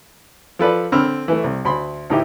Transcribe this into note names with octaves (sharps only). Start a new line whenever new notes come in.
F3 A4 B4 D5
D3 C4 B5 E6 F6
E3 A3
C2
D2 B5 C6
D2 A2 D#4 E4 G4